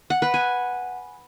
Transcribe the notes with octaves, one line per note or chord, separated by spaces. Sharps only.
F#5
B4
G#5